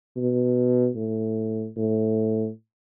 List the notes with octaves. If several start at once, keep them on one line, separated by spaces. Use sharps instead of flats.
B2
A2
A2